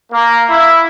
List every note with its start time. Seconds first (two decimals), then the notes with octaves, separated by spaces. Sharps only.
0.12 A#3
0.50 E4